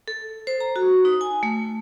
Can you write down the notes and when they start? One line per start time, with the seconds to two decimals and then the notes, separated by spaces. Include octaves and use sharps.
0.08 A4
0.47 C5
0.60 A#5
0.76 F#4
1.05 D#4
1.21 G#5
1.43 A3